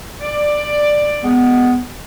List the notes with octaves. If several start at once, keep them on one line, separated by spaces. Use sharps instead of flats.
D5
G#3 B3